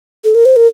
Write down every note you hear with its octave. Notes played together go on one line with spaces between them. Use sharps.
A4
A#4
C5
A#4